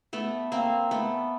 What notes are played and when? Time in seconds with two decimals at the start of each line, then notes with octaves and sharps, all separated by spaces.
0.13 A3 B3
0.52 A#3 C4
0.91 A3 B3